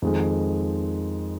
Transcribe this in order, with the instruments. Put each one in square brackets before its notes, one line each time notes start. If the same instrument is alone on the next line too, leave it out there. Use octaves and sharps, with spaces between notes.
[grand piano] F2 D#3 G#3